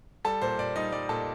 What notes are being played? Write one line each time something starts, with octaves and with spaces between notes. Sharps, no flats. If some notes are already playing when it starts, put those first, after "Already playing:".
G3 A4 A5
A#2 C5
A#2 D5
G3 D#4 D#5
G3 D5
A#2 A4 A5